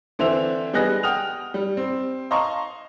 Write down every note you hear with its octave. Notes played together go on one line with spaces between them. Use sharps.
D3 E3 C4 C5 E5 F7
G3 B3 G#4 D#5 F#6 A#6
F#5 G5 D#6 F6 F7
G3
C4
D#5 F5 A5 A#5 C6 C#6